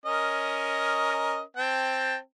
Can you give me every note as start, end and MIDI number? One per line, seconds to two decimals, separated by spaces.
0.06 1.40 61
0.06 1.40 70
0.06 1.40 75
1.57 2.17 60
1.57 2.17 79
1.57 2.17 81